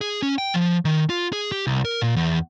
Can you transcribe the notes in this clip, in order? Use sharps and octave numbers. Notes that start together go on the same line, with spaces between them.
G#4
C#4
G5
F3
D#3
F4
G#4
G4
C2
A#4
A#2
E2